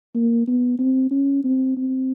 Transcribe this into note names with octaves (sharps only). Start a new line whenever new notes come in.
A#3
B3
C4
C#4
C4
C4